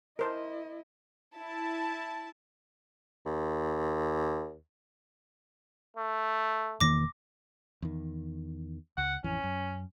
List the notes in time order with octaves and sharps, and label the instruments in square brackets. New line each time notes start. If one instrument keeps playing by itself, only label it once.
[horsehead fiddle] E4 D#5 [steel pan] A#4 C5 A5
[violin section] E4 A5
[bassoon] D#2
[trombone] A3
[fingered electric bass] E1 D#3 A#3 [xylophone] D6 A#6
[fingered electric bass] E2 D#3
[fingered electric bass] C#2 [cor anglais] F#5
[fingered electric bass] A1 F2 E3 [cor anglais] C#4
[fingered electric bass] F#2